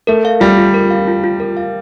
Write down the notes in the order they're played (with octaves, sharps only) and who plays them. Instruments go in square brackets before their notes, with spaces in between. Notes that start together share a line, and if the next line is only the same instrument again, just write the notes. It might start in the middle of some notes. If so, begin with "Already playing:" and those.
[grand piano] A3 [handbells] A#4
[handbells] F5
[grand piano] G3 [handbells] F4
[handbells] F4
A#4
F5
F4
F4
A#4
F5